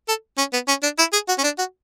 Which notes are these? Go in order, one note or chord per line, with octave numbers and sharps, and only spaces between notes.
A4
C#4
B3
C#4
D4
E4
G#4
F#4
C#4
D4
F#4